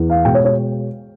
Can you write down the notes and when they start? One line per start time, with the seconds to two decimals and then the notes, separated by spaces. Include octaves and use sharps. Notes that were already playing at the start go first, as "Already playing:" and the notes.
Already playing: E2
0.10 F5
0.25 B2 G#3 G5
0.34 C#5
0.45 C#5